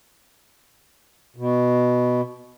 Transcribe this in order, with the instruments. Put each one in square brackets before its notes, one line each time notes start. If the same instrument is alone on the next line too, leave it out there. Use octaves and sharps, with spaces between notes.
[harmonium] B2